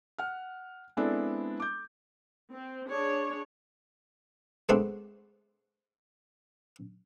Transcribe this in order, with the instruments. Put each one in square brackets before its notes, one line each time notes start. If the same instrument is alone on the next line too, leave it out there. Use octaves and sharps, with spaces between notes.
[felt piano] F#5 F6
G#3 B3 C4 D4 E4 A4
D6 G6
[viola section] C4
D4 G#4 C#5
[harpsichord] G#3 A3 B3 C4 D4